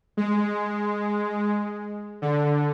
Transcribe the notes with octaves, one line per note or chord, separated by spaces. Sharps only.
G#3
D3